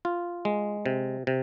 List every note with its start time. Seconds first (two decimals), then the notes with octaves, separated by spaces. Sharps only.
0.05 F4
0.45 G#3
0.86 C3
1.27 C3